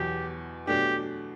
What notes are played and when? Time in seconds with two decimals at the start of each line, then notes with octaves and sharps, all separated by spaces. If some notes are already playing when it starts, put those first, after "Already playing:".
Already playing: E2 B2 F#3 G4
0.67 B2 F#3 A3 D4 G4